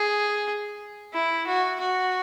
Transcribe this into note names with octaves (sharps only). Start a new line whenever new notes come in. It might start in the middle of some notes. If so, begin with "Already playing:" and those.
Already playing: G#4
E4
F#4
F#4